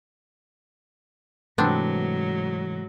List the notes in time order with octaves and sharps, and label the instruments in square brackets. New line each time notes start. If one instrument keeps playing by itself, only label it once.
[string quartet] G#2 F#3 [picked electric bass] C3 E3 A3 [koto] B3 C4 D4